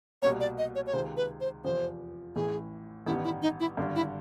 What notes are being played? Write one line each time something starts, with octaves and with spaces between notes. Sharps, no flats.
C2 B2 G3 A#3 C#5
D5
D#5
C#5
C#5
C#2 C3 D#3 G#3 C5
B4
C5
F1 E2 C3 F3 C5
A1 A2 E3 G#4
A1 G2 D#3 G3 B3 E4
E4
D#4
E4
G#1 G2 D3
E4